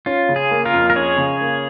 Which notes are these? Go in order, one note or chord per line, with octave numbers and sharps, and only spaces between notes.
C#4 F4
C#3
G#4
A#3
F4 A#4
F2
A#4
C#4 G#4 C#5
C#3
A#3